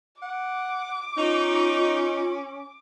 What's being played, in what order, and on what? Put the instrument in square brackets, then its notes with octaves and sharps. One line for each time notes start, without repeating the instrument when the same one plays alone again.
[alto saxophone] F#5 [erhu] D6
[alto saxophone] C#4 [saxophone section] D#4 [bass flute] F4